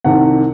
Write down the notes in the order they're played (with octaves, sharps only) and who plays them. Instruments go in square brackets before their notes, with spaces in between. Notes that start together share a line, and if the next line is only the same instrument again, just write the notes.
[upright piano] C2 C3 D#3 F#5